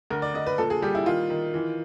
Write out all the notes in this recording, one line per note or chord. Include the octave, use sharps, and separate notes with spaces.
D2 A#4
D5
D2 D#5
B4
A#2 A4
G#4
G3 G4
E4
D#3 F4
D#3
E3